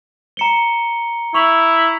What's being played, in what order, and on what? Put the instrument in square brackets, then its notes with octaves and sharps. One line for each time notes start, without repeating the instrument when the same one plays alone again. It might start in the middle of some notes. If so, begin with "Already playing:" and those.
[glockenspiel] A#5 C#7 G7
[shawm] E4 [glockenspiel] C#6 F7 F#7